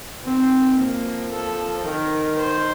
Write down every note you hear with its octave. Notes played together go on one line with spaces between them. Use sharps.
D#3 C4
F3 A#3
A4
D#3 A#4
C5